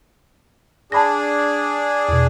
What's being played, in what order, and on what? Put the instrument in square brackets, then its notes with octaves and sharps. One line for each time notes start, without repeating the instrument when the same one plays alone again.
[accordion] D4 G#4 [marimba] A5 B5 A#6
[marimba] E2 B2